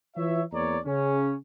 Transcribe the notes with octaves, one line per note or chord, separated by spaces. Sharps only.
E3 F4 C#5 E5
E2 A#3 C#5 D5 A#5
C#3 C#4